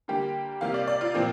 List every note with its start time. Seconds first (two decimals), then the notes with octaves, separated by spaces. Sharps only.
0.08 D3 G3 A#3 G4
0.61 C3 G3 A#3 F5
0.74 D5
0.87 D5
1.01 F4
1.14 A#2 F3 A#3 C4